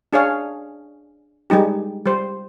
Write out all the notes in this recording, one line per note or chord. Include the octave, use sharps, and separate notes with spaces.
D4 G#4 C#5 F5
G3 G#3 D#4 G4
G3 C5